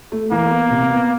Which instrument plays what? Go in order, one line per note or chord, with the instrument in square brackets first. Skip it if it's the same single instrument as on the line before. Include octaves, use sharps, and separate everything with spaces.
[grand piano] A3
[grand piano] E3 [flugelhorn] A#3
[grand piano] B3
C3
B3